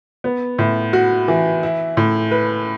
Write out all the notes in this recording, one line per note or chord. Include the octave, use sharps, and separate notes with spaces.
B3
A2
F#4
E3
E4
A2
B4